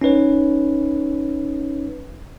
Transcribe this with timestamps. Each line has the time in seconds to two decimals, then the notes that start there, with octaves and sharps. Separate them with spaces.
0.01 C#4 D#4 B4 C#5